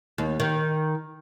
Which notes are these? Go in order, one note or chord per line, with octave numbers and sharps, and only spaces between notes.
D#2
D#3